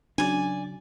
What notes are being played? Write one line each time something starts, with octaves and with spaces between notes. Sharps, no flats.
C#3 F#3 D4 D5 G#5